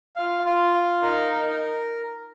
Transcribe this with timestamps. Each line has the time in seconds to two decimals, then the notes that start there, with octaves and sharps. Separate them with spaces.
0.16 F4 F5
0.45 F4
0.74 F5
1.02 D#4 A#4
1.32 A#4